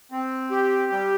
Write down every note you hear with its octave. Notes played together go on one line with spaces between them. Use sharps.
C4
G4
G3